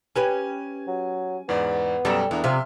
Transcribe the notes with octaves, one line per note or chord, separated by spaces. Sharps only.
C#4 G4 B4 G#5
F#3
E2 G#2 B3 D5
F#2 B2 G3 A4 A#5
E2 B3 D4 A#5
C3 F3 F4 E5 C6 F6